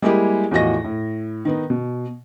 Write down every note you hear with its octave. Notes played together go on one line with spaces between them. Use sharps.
G3 G#3 A#3 E4 G4 G#4
E2 A2 F3 F#4 D#5 A#6
A2
D#3 B3 D#4
B2